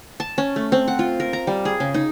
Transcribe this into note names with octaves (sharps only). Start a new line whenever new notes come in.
A5
C#4
A3
C4
F#5
F4
A#4
A#5
G3
G#4
C#3
D#4